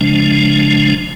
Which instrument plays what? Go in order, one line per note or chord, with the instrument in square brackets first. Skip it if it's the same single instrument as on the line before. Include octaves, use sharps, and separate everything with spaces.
[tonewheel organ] C#3 F3 G#3 D4